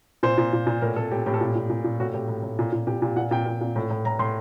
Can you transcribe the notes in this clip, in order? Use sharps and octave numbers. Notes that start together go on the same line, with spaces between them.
A#2 C5
A#2
A#2
A#2
A2 A#4
A2 A4
A2 G4
A2 G4
A4
A#2 G4
A#2
A#2
A#2
A2 F#4
A2 G4
A2
A2
A#2
A#2
A#2 G4
A#2 G4
A#2 F#5
A#2 G5
A#2
A#2
A2
A2
A2 A#5
A2 C6